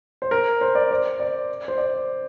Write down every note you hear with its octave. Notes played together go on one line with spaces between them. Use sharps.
C5
A#4
C5
D5
C5
D5
C5
D5